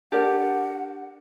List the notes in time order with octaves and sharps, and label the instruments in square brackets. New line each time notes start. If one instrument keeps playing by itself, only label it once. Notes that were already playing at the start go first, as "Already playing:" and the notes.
[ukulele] D4 G4 A#4 D5 [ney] F#5